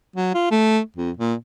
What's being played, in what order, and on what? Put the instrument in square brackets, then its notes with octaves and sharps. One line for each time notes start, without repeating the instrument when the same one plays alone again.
[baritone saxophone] F#3
F4
A3
F2
A#2